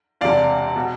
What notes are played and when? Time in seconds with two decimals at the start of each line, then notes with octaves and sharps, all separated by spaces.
0.21 E1 E2 C3 D5 F5
0.76 B2